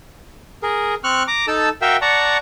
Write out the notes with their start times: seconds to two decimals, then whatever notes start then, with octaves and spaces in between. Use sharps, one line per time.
0.63 G#4 A#4
1.04 C4 C#6 F6 F#6
1.28 A#5 D6
1.48 D#4 A4 A5 E6
1.82 F#4 A#4 E5 F5 G5 E6
2.02 D5 F#5 A5 A#5 C#6